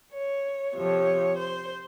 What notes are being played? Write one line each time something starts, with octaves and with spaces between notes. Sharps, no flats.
C#5
F2 C3 F3 C#5
C5